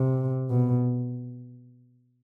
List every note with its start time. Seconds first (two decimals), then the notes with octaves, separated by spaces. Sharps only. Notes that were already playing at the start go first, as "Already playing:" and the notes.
Already playing: C3
0.50 B2